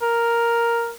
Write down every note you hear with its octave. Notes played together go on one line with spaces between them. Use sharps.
A#4